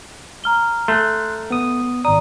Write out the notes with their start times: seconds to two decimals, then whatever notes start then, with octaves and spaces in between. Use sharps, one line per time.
0.44 A#5 F6 G7
0.88 A3 C6 F#6
1.50 B3 D#6
2.05 G#1 D5 A#5 D#6